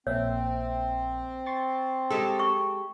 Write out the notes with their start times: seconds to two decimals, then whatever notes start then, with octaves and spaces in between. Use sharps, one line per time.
0.07 A#1 A#3 C4 C#5 E5
1.46 C6 C#6 A6
2.10 G#3 G4 A4
2.39 C#6